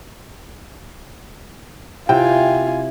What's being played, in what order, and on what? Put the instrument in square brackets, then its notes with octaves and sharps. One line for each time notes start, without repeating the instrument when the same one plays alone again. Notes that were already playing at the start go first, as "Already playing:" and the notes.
[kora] C3 [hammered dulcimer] E4 [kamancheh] F4 G#5 [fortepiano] G5